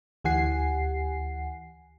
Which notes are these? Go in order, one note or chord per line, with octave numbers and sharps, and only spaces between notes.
D2 E3 G4 F#5 G#5 C7